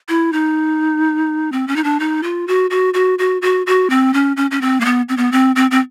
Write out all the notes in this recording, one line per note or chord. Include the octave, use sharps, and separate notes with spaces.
E4
D#4
C4
C#4
D#4
D4
D#4
F4
F#4
F#4
F#4
F#4
F#4
F#4
C4
C#4
C#4
C#4
C4
A#3
B3
C4
B3
C4
C4
C4